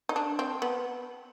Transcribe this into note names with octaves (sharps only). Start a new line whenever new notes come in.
D#4
D4
C4
B3